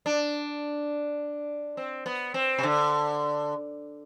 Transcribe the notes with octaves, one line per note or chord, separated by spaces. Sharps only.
D4
C4
B3
C4
C3
D3